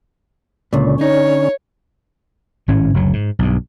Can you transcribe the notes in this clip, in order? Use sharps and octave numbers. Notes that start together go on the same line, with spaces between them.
C#2 A#2 D3 C#4
D#4 C#5
G#1 A2 C#4
F#1 D2 F#3
G#2
B1 G2